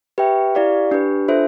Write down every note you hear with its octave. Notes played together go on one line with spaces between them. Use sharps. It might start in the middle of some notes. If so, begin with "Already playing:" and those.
G4 B4 E5 G5
E4 G4 D5 F5
D4 G4 B4
D4 F4 A4 C5 E5